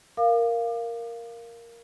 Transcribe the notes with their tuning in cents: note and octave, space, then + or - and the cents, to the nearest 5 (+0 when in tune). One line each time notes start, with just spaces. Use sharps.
A#4 +0 F5 -10 D6 +40